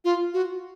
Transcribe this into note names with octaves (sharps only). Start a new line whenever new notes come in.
F4
F#4